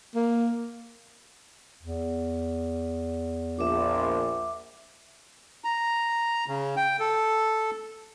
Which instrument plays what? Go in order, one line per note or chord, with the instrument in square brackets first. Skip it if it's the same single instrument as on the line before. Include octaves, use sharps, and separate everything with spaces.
[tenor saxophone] A#3
[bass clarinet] E2
[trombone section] A#1 [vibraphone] E5 D6
[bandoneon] A#5
C#3
G5
A4